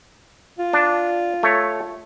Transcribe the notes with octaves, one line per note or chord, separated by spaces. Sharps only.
F4
D4
A3 C#5